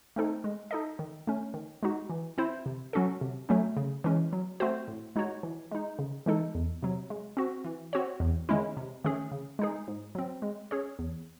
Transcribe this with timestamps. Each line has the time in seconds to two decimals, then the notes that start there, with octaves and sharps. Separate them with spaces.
0.16 A3 C4 D#4 A4
0.44 G#3
0.71 D#4 A4 D#5
0.99 D#3
1.27 A3 C#4
1.54 D#3
1.83 G#3 D#4 F#4
2.10 E3
2.38 C4 E4 C5
2.66 C3
2.93 F#3 C#4 F#4 A4
3.21 C3
3.49 F#3 A3 C#4
3.77 C#3
4.04 E3 G#3 C#4
4.33 F#3
4.60 A3 C4 F#4 C5
4.88 A2
5.16 G#3 D#4 F#4 C#5
5.43 E3
5.71 G#3 D#4
5.99 C#3
6.26 E3 G#3 D#4 A4
6.55 E2
6.82 C3 F#3
7.10 G#3
7.37 C4 F#4
7.65 E3
7.93 C4 F#4 C#5
8.20 E2
8.49 D#3 G#3 C#4 E4
8.77 C3
9.05 D#3 A3 C#4 G#4
9.32 C#3
9.59 G#3 D#4 G#4
9.88 G#2
10.15 F#3 C4
10.42 G#3
10.71 C#4 G#4 C#5
10.99 E2